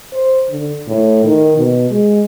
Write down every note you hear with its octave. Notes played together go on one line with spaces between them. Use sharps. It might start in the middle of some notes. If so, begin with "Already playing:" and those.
C5
D3
A2
D#3
B2
G#3